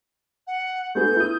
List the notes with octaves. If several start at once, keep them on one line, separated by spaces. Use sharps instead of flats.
F#5
A3 B3 G#4 G6
E4 D#6